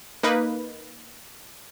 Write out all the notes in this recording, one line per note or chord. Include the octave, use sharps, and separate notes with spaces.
A#3 D#4 B4